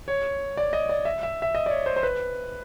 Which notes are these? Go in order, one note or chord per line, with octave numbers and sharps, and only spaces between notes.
C#5
D5
D#5
D5
E5
E5
E5
D#5
D5
C#5
C5
C5
B4